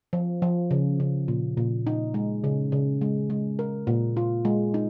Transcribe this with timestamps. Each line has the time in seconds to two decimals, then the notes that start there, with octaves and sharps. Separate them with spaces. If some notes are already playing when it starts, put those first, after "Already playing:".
0.13 F3
0.42 F3
0.71 C#3
1.00 C#3
1.28 A#2
1.57 A#2
1.87 D#4
2.14 G#3
2.44 C#3
2.72 C#3
3.01 G#3
3.30 G#3
3.59 A#4
3.87 A#2
4.17 F4
4.45 G#3
4.74 D#4